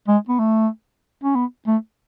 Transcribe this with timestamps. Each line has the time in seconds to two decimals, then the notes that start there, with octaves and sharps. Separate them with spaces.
0.08 G#3
0.29 B3
0.39 A3
1.23 C#4
1.35 B3
1.67 A3